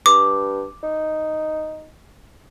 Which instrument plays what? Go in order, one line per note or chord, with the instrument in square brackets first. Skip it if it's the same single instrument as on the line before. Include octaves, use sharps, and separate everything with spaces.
[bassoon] G2 [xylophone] D6
[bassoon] D#4